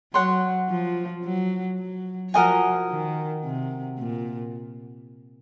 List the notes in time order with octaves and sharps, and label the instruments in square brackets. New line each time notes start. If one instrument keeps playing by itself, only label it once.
[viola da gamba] F#3 [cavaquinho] C#5 F#5 C6
[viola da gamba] F3
F#3
F#3
[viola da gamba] F3 [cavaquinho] F#4 A#4 D#5 G#5
[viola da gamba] D#3
C3
A#2